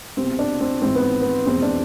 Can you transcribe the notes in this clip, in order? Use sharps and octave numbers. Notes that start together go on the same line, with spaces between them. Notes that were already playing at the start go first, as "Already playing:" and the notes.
C2 B2 C4
D4
C4
G#1 G#2 E3 C4
B3
B3
F1 E2 B2 C4
D4